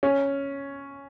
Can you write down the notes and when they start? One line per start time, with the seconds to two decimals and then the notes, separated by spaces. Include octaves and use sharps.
0.03 C#4